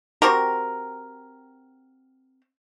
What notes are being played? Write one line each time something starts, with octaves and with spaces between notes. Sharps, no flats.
C4 F#4 G4 A#4